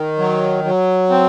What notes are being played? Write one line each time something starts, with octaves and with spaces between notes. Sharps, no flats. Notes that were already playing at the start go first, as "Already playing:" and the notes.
Already playing: D#3
F#3
F#3
C4